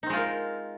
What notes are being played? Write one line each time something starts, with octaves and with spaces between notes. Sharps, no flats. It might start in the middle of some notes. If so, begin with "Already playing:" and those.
G#3 C4 D#4 F4 A#4